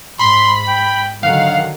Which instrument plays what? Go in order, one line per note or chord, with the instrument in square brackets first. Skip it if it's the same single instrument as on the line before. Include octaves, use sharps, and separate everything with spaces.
[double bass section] G#2 [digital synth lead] B5 [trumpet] C6
[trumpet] G5
[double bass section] D3 D#3 F#3 [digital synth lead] F5 [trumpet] F#5